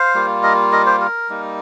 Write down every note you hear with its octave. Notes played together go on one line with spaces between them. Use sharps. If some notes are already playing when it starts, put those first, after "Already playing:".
Already playing: C5 F5
G3 A#3 F4
A#4 D#5
A#4 D#5
G4 C5
A#4
G3 A#3 D#4